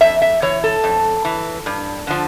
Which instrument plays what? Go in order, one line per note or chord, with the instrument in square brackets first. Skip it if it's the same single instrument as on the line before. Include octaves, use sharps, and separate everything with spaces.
[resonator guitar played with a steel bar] F2 E5
E5
E3 C#5
A4
F2
E3
G2
D3 F3